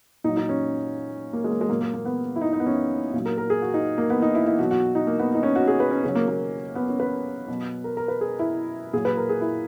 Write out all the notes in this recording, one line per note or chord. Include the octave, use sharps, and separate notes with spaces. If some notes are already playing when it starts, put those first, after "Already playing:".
A#2 F#3 D#4
D#4
C#4
A#3
G#3
A#3
G#3
A#2 F#3 A#3
A#3
A#3
B3
E4
D#4
D#4
B3
C#4
A#2 F#3
A#4
A#4
G#4
F#4
D#4
A#3
B3
D#4
E4
E4
B2 F#3 F#4
F#4
D#4
A#3
B3
D#4
C#4
F#4
G#4
B4
C#4
C#3 F#3 C#4
A#3
A#3
B3
C#4
B4
B2 F#3
A#4
A#4
B4
G#4
E4
A#2 F#3 G#4
B4
A#4
G#4
E4